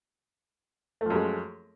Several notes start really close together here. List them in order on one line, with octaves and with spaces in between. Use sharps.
A3 F3 F#2 G#3